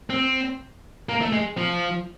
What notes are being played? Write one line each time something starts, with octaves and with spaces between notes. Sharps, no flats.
C4
A#3
A3
G#3
F3